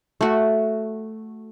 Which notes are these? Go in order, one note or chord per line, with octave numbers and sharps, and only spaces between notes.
A3 F#4